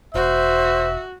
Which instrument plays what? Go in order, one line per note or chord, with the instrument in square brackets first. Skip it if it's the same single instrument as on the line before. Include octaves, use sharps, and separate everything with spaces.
[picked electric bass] E1 [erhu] F#4 [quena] C5 [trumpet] E5